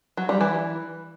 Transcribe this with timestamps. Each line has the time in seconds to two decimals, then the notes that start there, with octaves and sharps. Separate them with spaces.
0.17 F#3
0.29 G3
0.41 E3